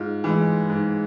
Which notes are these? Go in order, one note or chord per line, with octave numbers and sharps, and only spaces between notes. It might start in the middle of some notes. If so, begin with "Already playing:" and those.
Already playing: G#2 F4
E3 G#3
G#2